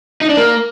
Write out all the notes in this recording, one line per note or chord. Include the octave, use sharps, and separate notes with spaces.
D#4
D4
A#3